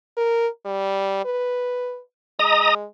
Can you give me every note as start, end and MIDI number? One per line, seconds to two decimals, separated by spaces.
0.17 0.48 70
0.66 1.23 55
1.25 2.00 71
2.39 2.86 56
2.39 2.74 75
2.39 2.74 82
2.39 2.74 87